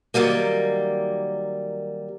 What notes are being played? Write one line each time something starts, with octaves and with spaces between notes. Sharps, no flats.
D#3 E3 F#3 G3 A#3